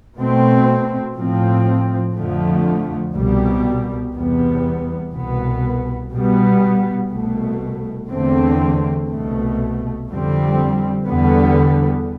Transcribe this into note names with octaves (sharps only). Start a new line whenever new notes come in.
B2 A3 C4
A2 F3 C4
F2 D3 F3 A3
C2 B2 G3
E2 C3 G3 B3
C2 B2 B3
B2 G3 B3
C2 B2 A3
E2 D3 A3 C4
C2 B2 A3
F2 D3 G3 C4
E2 D3 G3 B3